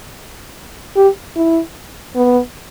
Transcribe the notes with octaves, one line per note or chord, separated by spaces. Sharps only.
G4
E4
B3